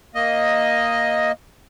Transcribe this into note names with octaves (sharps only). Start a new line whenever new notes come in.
A#3 D#5